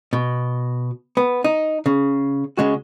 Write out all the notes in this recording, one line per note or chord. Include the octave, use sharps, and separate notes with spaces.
B2
B3
D#4
C#3
C#3 G#3 F#4